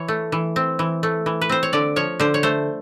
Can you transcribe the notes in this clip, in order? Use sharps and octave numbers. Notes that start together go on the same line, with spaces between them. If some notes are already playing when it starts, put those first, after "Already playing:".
Already playing: E3 C#5
A3
E3
C4
E3
A3
E3
B4
C4 C5
C#5
D3 D5
F3 C#5
D3 C5
C#5
A3 C5